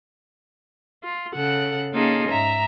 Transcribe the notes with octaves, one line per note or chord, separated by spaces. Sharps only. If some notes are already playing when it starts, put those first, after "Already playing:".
F4
C#3 A4 F#5 F#6
A#3 C#4 D#4 F4 G#4 A4
G#2 E5 A#5